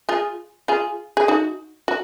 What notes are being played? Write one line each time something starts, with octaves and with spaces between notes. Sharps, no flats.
F4 G#4
F4 G#4
G#4
D#4 F#4
F#4